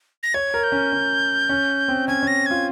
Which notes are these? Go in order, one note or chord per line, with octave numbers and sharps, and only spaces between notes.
A#6
C#5 G#6
A#4
G6
C#4
C#4
C#4
C4
C#4 G#6
C#4 A#6
F4 G#6